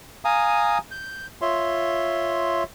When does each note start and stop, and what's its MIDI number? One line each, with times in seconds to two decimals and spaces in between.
0.25 0.78 77
0.25 0.78 80
0.25 0.78 82
0.25 0.78 87
0.91 1.27 91
1.41 2.63 65
1.41 2.63 73
1.41 2.63 76
1.41 2.63 84